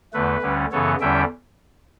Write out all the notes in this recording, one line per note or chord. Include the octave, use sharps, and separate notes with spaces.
E2 D3 A3 B4
D2 D3 G3 C#4
F#2 C#3 E3 B3 A4 C#5
E2 D3 G3 C#4 E5 G5